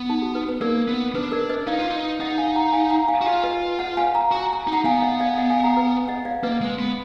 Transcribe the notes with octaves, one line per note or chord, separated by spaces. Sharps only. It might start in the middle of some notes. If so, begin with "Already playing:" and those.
Already playing: B3
D#4
F#4
B4
B4
A#3 A#4 D5
B3
D4 B4
A#4 D5
B4 D#5
D#4 D5 F5
F4
D#4
D#4 D#5 F#5
F#5
F5 G#5
F#5 A#5
F5 G#5
F#5 A#5
F5 G#5
F#4
F4 D5 F5
B4 D#5
D#5 F#5
F5 G#5
A#5
F#4 A#5
A#5
D#4
F#5 A#5
B3 F5 G#5
D#5 F#5
D5 F5
D#5 F#5
F5 G#5
F#5 A#5
B4
D#5 F#5
D5 F5
A#3 B4 D#5
G#3
B3